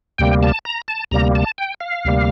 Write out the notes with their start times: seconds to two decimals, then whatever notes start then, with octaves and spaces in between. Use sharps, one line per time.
0.18 D2 C3 G3 A#3 G5
0.43 A5
0.65 A#5
0.88 A5
1.11 D2 C3 G3 A#3 A#5
1.35 A5
1.58 G5
1.80 F5
2.05 D2 C3 G3 A#3